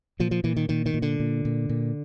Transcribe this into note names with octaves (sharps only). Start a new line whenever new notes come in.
A#2 F3
F3
A#2 E3
D#3
A#2 D#3
D#3
A#2
D3
A#2
A#2
A#2